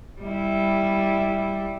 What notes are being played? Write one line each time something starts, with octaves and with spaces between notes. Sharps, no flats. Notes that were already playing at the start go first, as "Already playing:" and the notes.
G3 E4